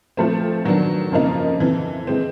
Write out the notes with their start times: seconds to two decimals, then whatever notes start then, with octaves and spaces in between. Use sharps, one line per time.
0.17 F3 A3 C4
0.65 D#3 F#3 B3 D4 F#4
1.12 F2 C#3 F3 A#3 D#4
1.60 F2 C3 E3
2.07 E3 G#3 C4